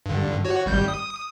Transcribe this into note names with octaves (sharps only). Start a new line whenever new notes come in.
G2 D3
F#4 C#5
G#1 G3 G6
D#6